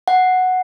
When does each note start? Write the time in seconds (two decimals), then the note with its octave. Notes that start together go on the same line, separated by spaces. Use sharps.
0.08 F#5